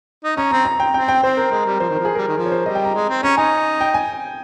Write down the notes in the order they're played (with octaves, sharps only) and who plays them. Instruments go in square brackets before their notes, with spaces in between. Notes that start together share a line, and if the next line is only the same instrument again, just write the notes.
[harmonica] D#4
[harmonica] C#4 [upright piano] A#5
[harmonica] C4 [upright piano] A#5
[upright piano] A#5
G5
[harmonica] C4 [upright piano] G5
[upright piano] G5
[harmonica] C4 [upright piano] C5
[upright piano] A#4
[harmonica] G#3 [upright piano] A#4
[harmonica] G3
[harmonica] F3 [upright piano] C5
[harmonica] D#3
[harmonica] F3 [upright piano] A#4
[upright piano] G#4
[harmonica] G3 [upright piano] A#4
[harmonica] D#3
[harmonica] F3 [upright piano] A#4
[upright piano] C#5
C5
[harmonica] G3 [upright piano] D#5
[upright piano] G5
A#5
[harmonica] G#3
C4
[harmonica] C#4 [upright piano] A#5
[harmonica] D#4 [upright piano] G#5
[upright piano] G5
G#5